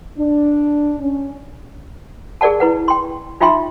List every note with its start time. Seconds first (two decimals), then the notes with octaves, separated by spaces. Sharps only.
0.17 D4
1.00 C#4
2.41 G#4 A#4 D5 F#5 A5
2.60 E4 B4 F#5
2.88 G5 C6
3.40 D#4 F4 E5 G5 C6